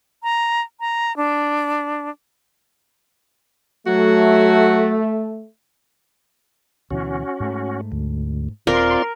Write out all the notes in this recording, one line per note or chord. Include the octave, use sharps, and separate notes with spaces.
A#5
A#5
D4
F#3 A3 F#4
D2 B2 E3 C#4 F#4
G#2 A3
D2
D#1 C4 F4 A#4 D5 C6